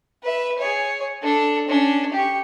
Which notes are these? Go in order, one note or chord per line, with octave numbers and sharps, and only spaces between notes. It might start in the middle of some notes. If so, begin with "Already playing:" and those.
B4 E5
G#4 C#5
D4 A4
C#4 D4
G4 C#6